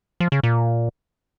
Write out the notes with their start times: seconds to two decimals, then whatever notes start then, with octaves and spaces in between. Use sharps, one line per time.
0.20 F3
0.32 C#3
0.43 A#2